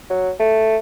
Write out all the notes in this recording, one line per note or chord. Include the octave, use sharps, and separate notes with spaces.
F#3
A3